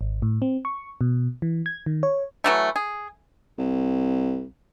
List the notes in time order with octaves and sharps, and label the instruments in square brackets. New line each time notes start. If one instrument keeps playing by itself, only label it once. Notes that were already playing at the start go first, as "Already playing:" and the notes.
[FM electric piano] G#1
A2
C4
C#6
B2
E3
G#6
D#3
C#5
[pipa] E3 F#3 A3
G#4
[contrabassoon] C2